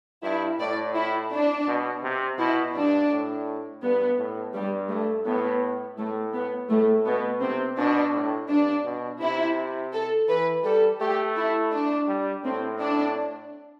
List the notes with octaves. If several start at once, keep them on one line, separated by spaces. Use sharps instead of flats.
G2 E4
A2 D5
E4
D4
B2
C3
B2 E4
G2 D4
A2
G2 B3
A2
G2 G3
A3
A2 B3
A2 A3
B3
A2 A3
B2 B3
C3 C4
B2 D4
A2
G2 D4
B2
C3 E4
A4
E3 B4
G3 A4
A3 G4
E4
D4
G3
A2 C4
D4